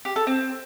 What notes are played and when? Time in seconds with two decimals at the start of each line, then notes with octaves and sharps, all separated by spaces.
0.05 G4
0.16 A4
0.27 C4